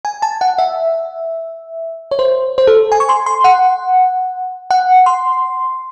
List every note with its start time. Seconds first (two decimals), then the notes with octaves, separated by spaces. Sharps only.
0.05 G#5
0.22 A5
0.41 F#5
0.58 E5
2.11 C#5
2.19 C5
2.58 C5
2.67 A4
2.92 G#5
3.00 C#6
3.09 C6
3.26 C6
3.44 F#5
4.71 F#5
5.06 C6